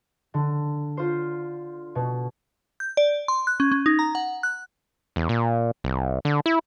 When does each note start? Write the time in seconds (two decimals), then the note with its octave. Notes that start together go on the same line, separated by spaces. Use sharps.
0.34 D3
0.97 F4 C5
1.95 B2
2.80 G6
2.97 D5
3.28 C6
3.47 F#6
3.60 C#4
3.72 C#4
3.86 D#4
3.99 A#5
4.15 F#5
4.43 F#6
5.16 E2
5.29 A#2
5.84 C2
6.25 D3
6.46 E4